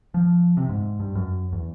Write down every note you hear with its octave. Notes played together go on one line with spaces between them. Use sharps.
F3
C3
G#2
G2
F#2
E2